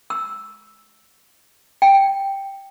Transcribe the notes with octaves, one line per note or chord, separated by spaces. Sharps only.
E6
G5